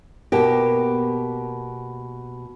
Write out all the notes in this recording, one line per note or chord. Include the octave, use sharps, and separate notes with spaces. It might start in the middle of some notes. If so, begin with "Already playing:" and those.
B2 A#3 G4